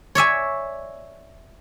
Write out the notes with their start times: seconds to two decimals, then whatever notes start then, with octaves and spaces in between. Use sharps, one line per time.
0.15 C#5 D5 E5 G#5